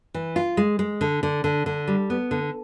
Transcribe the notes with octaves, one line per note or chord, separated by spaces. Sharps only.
E3
F4
G#3
G#3
D3
D3
D3
D3
G3
B3
D3